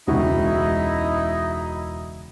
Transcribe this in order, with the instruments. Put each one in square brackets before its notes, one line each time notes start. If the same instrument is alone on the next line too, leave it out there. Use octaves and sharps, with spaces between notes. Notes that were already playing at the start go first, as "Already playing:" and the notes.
[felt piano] E1 C#2 F#4 [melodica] D#4 E4 D#5